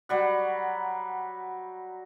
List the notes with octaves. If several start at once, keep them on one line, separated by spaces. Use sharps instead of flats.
F#3 G3 F#5